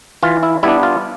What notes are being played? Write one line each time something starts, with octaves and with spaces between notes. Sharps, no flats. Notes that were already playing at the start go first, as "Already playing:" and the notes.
E3 F4
E4
G3 B3 D4 E4
F4